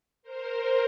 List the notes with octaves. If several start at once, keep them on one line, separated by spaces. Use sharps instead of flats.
A#4 C5